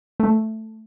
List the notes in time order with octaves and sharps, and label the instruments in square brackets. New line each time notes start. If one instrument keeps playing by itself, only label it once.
[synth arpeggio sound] A3